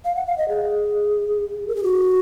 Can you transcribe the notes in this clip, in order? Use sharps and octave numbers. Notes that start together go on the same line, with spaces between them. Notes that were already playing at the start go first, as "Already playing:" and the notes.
F5
F#5
F5
D#5
G#4
A#4
G#4
F#4